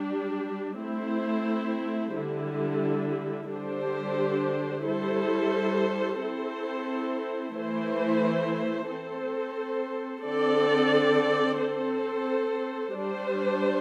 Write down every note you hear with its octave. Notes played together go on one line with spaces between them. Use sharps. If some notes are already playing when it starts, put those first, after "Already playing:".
Already playing: G3 D4 G4
A3 C4 E4 C5
D3 G3 E4
D3 G3 D4 G4 C5
G3 E4 A4 C5
C4 E4 A4 C5
E3 A3 E4 C5
C4 A4 C5
D3 C4 A4 D5
C4 A4 C5
G3 D4 C5